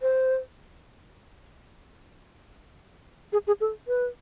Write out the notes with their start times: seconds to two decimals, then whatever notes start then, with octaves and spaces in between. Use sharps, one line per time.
0.02 C5
3.33 G#4
3.47 G#4
3.61 A4
3.88 B4